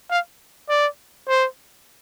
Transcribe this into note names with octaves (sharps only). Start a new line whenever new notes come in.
F5
D5
C5